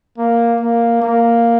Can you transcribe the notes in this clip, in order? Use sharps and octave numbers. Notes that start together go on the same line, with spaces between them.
A#3
A#3
A#3